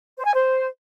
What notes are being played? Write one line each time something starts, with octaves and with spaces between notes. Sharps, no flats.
C5
G#5
C5